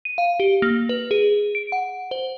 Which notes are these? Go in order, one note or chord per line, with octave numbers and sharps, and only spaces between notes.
D#7
F5
G4
A#3
B4
G#4
D7
F#5
C5